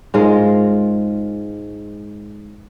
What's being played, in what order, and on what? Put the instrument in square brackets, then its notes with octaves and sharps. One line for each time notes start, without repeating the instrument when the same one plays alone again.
[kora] G#2 G#3 F4 A#4